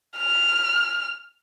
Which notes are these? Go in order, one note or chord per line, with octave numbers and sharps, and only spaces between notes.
F6